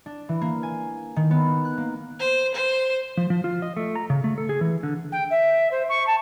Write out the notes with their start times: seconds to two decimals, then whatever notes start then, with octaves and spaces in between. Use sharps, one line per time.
0.06 D4
0.29 E3
0.41 A#3
0.63 G#5
1.16 D#3
1.31 B3
1.65 F#6
1.78 A#3
2.20 C5
2.55 C5
3.17 F3
3.30 F3
3.44 F4
3.62 D#5
3.77 A3
3.96 A#5
4.10 C#3
4.24 A3
4.38 A4
4.49 G#4
4.61 E3
4.83 D3
5.12 G5
5.30 E5
5.71 C5
5.89 C#6
6.07 A5